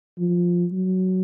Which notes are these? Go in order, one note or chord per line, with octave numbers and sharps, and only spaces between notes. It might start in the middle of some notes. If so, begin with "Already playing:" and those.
F3
F#3